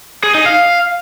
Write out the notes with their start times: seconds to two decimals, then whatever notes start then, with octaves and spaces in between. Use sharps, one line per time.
0.24 G#4
0.35 D#4
0.46 F5